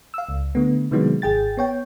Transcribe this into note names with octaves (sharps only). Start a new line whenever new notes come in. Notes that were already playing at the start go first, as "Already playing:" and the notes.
F5 E6
C#2
D3 A3 B3
C3 D#3 E3 F#3 G#3 B3
G#1 G#4 G5 A6
B3 C#5 G5